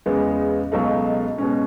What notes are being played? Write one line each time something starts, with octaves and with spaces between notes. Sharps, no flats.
E2 C#3 G#3 B3
C#2 B2 F#3 A3 D#4
B2 G#3 C#4